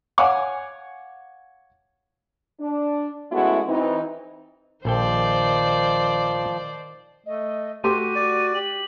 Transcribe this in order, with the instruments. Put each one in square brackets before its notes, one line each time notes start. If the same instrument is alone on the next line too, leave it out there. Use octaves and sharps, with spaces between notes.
[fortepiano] C#5 F5 F#5 G#5 D6
[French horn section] D4
G#3 A3 B3 C#4 E4 F#4
E3 C4 D#4
[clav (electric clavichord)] A#1 A4 G5 [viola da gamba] D#3 C5 D5 [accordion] F3
[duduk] A3 [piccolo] D#5
[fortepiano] A3 G4 C6 [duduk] F#4 [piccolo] D#7
[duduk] F#4 [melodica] D5
[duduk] G4 [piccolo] F#7